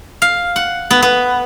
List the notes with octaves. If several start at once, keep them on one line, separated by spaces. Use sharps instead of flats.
F5
F#5
B3
B3